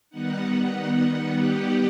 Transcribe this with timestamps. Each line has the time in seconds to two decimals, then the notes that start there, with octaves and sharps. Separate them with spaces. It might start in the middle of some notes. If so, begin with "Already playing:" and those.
0.10 D#3 G3 B3 D#4 F#5
1.35 G4